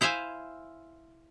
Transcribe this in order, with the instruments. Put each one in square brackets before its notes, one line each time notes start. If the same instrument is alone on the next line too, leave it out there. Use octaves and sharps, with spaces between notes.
[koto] E4 C5 E5 F5 G#5